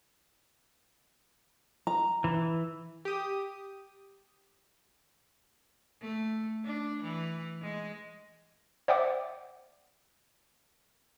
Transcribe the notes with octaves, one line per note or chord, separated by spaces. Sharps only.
A#5
E3
G4 D#6
A3
D4
E3
G#3
C5 D5 E5 F#5 G5 D6